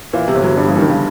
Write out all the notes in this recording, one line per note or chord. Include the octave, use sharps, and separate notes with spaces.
A#2 E3
C3
G1
F#3
G2 G3
F3
E3
G2 D#3
C#3